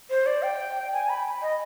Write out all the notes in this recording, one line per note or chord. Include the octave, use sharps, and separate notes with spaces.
C5
D5
G5
G#5
B5
D#5